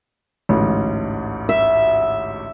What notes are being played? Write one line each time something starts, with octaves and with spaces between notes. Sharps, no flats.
A1 D2 G#2
E5